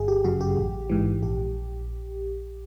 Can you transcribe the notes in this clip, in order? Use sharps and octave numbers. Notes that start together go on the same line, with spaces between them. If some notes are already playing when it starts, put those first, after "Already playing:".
Already playing: G1 G#4
G4
F#2 C#3 F#4
G4
A1
G#2 E3
A#1 G4